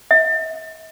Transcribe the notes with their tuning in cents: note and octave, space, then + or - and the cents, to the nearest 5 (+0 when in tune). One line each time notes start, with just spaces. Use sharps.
E5 -45